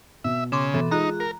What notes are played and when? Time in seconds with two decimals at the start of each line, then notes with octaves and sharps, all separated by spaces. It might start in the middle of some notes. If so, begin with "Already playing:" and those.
0.24 B2 E5
0.52 C#3 C6 D6 E7
0.74 B2 E3 A4
0.91 G#3 D#4 F4 A#5 F#6
1.20 A#4